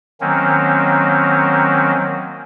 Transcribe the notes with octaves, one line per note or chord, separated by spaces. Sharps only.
D#3 F#3 A#3 C4 C#4